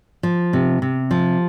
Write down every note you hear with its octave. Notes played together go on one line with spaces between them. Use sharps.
F3
C3
C3
F3